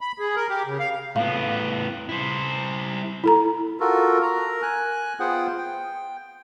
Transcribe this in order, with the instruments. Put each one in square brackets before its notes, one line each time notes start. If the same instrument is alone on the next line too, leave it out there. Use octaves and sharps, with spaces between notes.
[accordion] B5
G#4
A#4
G4
C#3
F5
[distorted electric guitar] A2 B3 [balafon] F5
[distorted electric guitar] E4 C5
[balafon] E4 A4 A#5
[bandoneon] F4 F#4 A4 A#4
A#4 A#5
G#5 F#6
B3 F4 G#4 C5 F#5 G5
G5